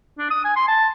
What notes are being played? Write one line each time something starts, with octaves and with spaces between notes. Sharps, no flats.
D4
D#6
G#5
C6
A5